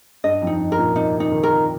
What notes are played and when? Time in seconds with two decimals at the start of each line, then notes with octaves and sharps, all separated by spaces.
0.24 G2 D#5
0.42 F2
0.47 D#4
0.59 G2
0.72 A#4
0.78 A#2
0.96 C3 D#4
1.20 D#4
1.32 D#3
1.43 A#4